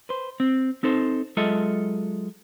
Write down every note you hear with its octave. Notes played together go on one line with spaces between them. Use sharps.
B4 C5
C4
C4 D#4 A4 C5
F#3 G#3 F4 A4 D#5 E5